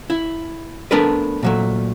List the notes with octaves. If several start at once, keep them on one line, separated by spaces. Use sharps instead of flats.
E4
A3 B3 D4 A#4 B4
A#2 F#3 A3